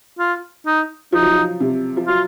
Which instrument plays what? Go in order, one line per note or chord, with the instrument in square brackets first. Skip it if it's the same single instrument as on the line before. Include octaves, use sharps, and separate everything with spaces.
[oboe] F4
D#4
[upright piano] F3 [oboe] D#4
[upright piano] F#3
F3
C3
F3
[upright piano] F#3 [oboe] F4